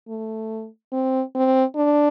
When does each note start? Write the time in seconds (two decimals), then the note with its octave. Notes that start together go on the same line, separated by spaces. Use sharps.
0.08 A3
0.92 C4
1.35 C4
1.76 D4